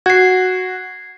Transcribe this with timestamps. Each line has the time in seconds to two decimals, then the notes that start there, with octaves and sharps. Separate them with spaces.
0.06 F#4 G#6 C7